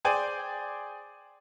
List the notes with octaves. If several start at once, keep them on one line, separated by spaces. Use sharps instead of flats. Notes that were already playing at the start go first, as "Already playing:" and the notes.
G#4 C5 D5 G5 G#5